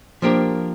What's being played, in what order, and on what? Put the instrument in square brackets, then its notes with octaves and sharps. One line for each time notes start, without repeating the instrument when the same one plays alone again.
[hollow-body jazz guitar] F3 A#3 D4 G4 A#4